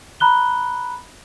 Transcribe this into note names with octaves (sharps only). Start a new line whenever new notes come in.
A#5 B5 F#6 G7